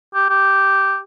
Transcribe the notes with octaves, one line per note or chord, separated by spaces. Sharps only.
G4
G4